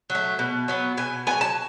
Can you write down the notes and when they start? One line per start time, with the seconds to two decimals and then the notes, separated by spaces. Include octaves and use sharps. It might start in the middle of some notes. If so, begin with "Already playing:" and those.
0.10 F#3
0.15 A3
0.39 B2
0.68 F#3 B3
0.97 B2 G#5
1.27 F#3 B3 G#5
1.41 A5